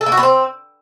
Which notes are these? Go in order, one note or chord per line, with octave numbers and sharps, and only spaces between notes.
A4
A#3
F#4
B3
C4